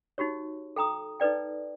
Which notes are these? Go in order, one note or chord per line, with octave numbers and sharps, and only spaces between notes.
D#4 F#4 G4 C#5
A4 G5 A#5 D#6
D#4 A4 B4 D5 G5